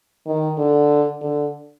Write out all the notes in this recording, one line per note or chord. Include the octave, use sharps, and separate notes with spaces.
D#3
D3
D3